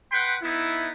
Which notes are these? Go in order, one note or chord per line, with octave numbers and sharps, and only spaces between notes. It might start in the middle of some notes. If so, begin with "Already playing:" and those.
B4 F#5 G5 B5 C6
B3 D#4 E4